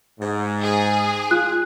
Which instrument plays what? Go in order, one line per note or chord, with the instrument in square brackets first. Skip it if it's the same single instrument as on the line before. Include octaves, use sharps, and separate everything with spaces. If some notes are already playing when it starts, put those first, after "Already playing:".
[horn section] G#2
[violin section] G#4
[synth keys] F4 [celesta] F#6